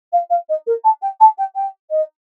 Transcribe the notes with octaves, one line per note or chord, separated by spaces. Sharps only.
F5
F5
D#5
A#4
A5
G5
A5
G5
G5
D#5